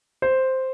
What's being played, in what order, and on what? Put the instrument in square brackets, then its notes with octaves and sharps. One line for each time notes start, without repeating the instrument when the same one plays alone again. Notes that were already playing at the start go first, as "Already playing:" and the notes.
[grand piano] C5